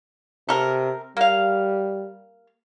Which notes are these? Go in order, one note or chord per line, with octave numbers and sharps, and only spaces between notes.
C3 A4 A#4
G3 A#3 F5